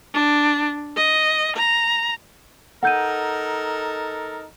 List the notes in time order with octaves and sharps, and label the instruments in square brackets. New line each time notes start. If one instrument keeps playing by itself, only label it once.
[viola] D4
D#5
A#5
[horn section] D#4 A4 A#4 [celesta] F#5 G6 D#7